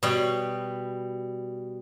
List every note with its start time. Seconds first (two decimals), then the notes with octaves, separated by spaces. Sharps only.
0.03 B2 G3